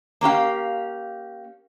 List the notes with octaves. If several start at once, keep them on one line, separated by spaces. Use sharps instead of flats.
A#3 C#4 G4 F5